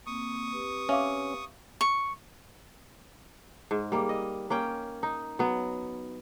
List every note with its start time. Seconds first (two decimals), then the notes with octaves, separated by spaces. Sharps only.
0.06 A#3 C4 C#6 D#6
0.53 C4 G4 B4
0.89 C#4 E5 F5 D6
1.81 C#6
3.71 G#2
3.92 G3 A#3
4.09 D#5
4.50 A#3 C#4 G5
5.03 D#4
5.39 F#3 B3